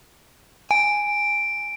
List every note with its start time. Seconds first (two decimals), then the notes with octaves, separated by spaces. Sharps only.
0.71 G#5 D7